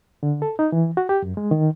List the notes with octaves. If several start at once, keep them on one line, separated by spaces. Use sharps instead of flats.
D3
A4
D#4
E3
F#4
G4
F#2
G#3
D#3